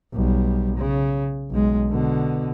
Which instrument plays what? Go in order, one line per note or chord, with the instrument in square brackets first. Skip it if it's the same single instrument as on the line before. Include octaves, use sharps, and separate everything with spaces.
[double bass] B1 G3
C#3
B1 G#3
B2 D3